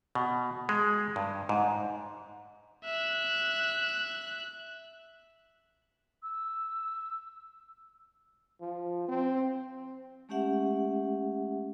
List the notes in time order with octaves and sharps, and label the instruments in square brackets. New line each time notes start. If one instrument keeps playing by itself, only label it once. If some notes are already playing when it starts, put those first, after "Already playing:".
[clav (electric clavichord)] B2
G#3
G2
G#2
[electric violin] E5 F#6
[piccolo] E6
[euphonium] F3
C4
[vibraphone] G#3 A3 C#4 G4 E5 F#5